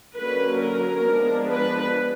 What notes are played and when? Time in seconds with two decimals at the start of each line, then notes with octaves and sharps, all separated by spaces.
0.17 D3 F#3 A#3 C#4 B4
0.61 A#4
1.05 F3 G#3 B3 D4
1.48 B4